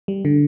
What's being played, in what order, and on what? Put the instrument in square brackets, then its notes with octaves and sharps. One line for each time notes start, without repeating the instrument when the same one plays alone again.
[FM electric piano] G3
D3